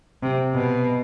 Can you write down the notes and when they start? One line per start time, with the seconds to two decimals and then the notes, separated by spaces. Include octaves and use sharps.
0.22 C3
0.55 B2